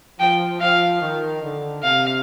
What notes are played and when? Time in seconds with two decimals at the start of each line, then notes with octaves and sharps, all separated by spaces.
0.19 F3 G5
0.60 F3 F5
1.01 D#3
1.42 D3
1.83 C3 F5